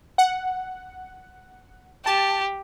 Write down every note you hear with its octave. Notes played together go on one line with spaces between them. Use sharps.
F#5
G4 A5